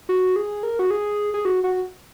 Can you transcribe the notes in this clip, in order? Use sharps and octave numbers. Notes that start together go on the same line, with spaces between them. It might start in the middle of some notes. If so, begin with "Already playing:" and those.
F#4
G#4
A#4
F#4
G#4
G#4
F#4
F#4